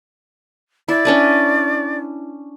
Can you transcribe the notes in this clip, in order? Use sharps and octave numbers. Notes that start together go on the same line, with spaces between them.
E4 D5
C#4 D4 B4